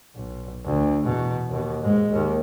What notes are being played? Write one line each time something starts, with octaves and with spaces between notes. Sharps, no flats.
B1
D2
E2 B2
D#2 B2
G#2 G#3
D#2